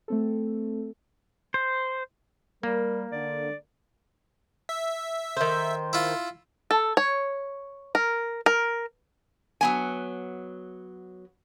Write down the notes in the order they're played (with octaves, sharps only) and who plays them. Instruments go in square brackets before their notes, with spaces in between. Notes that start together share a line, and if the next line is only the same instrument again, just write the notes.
[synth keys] A3 C4 A4
[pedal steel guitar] C5
[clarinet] G3 [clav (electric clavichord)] A#3 [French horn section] A#4
[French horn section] D3 [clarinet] D5
[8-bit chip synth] E5
[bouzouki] D#3 C5
[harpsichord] E4 F4
[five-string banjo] A4
C#5
A#4
A#4
[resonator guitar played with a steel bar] F#3 B3 G#5